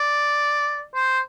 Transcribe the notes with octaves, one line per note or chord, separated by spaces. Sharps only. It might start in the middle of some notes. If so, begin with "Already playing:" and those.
Already playing: D5
C5